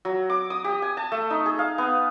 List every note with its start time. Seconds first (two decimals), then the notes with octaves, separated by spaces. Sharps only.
0.05 F#3
0.30 D6
0.50 D#6
0.64 G4
0.82 G#5
0.97 A5
1.12 A3
1.30 D#4
1.46 G#4
1.59 F5
1.78 B3